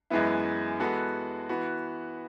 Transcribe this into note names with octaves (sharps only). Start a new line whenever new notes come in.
F#2 E3 G#3 B3 E4
E3 G#3 B3 F#4 A4
E3 B3 F#4